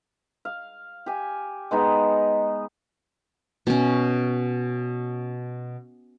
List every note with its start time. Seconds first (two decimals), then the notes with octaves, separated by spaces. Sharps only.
0.45 F5
1.06 G4 G#5
1.71 G#3 B3 D#4
3.67 B2 C#4